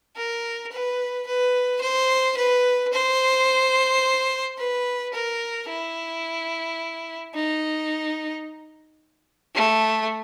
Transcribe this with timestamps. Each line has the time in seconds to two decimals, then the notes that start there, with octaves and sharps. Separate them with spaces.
0.16 A#4
0.72 B4
1.27 B4
1.81 C5
2.37 B4
2.93 C5
4.58 B4
5.14 A#4
5.69 E4
7.34 D#4
9.55 A3